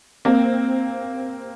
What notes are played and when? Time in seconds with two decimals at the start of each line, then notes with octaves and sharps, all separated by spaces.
0.25 A#3 C4